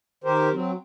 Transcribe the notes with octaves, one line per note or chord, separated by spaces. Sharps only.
D#3 G4 A#4 C5
F#3 C4